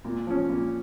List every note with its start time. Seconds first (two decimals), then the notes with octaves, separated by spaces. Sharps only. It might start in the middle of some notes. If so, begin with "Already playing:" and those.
0.05 A#2
0.27 F3 C#4
0.49 A#2